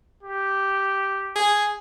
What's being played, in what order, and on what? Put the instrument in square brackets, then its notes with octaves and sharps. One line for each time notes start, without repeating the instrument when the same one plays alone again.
[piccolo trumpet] G4
[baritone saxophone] G#4